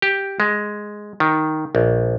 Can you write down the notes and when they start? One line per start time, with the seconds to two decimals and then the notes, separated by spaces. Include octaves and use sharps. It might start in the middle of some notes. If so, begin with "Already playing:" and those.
0.02 G4
0.40 G#3
1.20 D#3
1.75 A#1